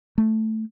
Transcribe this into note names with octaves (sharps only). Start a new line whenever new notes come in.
A3